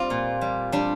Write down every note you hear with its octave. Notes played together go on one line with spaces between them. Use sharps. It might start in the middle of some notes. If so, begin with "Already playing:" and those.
Already playing: G3 C4 F4 D5
A#2
G3
G3 D4